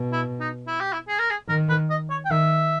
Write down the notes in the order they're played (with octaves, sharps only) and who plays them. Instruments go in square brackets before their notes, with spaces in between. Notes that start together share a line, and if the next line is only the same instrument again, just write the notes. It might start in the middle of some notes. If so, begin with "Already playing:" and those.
Already playing: [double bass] B2
[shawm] E4
D#4
E4
G4
E4
G#4
A#4
G#4
[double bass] D#3 [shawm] A#4
[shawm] B4
D#5
C#5
G5
[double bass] D#3 [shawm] E5